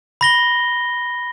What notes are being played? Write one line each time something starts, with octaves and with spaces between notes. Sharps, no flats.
B5 A#6 G7